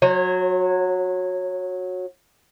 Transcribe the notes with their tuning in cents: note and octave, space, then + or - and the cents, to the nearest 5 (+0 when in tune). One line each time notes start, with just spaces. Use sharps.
F#3 -15 C#5 -45